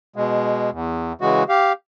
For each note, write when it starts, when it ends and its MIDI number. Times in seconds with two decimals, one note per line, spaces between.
0.16 0.70 47
0.16 0.70 56
0.72 1.13 40
1.21 1.43 49
1.21 1.43 52
1.21 1.43 56
1.21 1.43 66
1.49 1.72 67
1.49 1.72 77